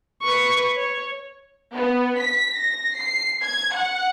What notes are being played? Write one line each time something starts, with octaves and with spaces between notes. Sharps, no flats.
B4 C#6
C#5
B3
B6
A#6
C7
G#6
F#5